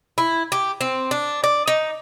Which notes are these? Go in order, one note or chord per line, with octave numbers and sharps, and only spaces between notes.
E4
G4
C4
D4
D5
D#4